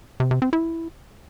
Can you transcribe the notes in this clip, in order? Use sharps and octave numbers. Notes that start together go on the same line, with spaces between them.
C3
C3
C4
E4